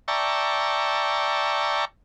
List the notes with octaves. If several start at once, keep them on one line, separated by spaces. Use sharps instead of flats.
D5 E5 G5 A5 A#5 C#6